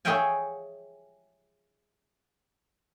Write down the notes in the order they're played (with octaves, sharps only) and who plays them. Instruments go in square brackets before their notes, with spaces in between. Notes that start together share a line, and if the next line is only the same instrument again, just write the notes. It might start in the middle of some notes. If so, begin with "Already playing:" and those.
[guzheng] G#4 C#5 E5 F5 G5 G#5